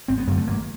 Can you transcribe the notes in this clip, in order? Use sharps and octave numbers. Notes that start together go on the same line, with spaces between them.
G#1 C4
B3
F#2 D3 A#3
A3
G#1 A#3